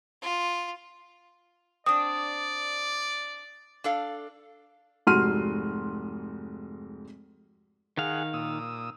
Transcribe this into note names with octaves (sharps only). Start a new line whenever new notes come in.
F4
C4 D4 D5 D#6
D4 A4 F5
F1 G#2 F#4 C6 F6 D#7
D#3 G#4 F5 F#5
A#2 D#6 E6